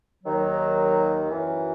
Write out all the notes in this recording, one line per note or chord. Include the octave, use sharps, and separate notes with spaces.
D#2 D#3 F#3
F#2 E3